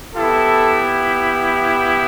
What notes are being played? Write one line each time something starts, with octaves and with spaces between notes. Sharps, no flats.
B3 E4 G4 A4